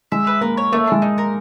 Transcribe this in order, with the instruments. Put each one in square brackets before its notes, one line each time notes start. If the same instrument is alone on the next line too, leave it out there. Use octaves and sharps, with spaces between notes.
[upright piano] G#3 [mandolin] E5
[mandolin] B4
[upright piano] A#3 [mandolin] A#4
[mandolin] C#5
[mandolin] A3 [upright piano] A#3
[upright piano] G#3 [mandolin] D4
[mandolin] D#4
A#4